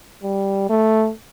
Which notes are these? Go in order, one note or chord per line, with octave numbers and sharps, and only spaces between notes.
G3
A3